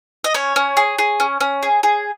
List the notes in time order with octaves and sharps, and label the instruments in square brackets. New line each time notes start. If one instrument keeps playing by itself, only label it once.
[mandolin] D#5
C#4 C#5
C#4
G#4
G#4
C#4
C#4
G#4
G#4